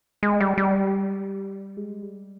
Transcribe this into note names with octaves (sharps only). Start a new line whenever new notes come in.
G#3
G3
G3
G#3
G3